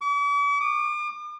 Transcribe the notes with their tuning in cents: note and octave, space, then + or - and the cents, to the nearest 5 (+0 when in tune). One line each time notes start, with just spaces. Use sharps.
D6 -45
D6 +45